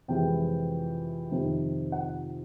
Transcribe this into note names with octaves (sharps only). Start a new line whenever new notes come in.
F2 C3 E3 G#3 G5
F2 C3 D#3
F#5